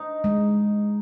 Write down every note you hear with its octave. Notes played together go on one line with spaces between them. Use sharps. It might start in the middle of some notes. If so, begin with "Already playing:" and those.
Already playing: D#4
G#3